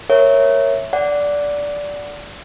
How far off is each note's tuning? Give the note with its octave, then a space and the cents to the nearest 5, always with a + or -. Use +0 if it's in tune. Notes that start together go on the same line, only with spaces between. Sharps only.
A#4 +0 C#5 -10 E5 +0
D5 -10 F#5 +0